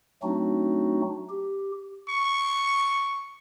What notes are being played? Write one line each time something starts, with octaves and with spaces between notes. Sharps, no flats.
F#3 A3 C4 D4 D#4 F#4
G4
C#6